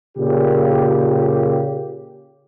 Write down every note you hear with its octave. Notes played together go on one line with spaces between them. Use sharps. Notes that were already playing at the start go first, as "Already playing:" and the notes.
A#2 C#3 G4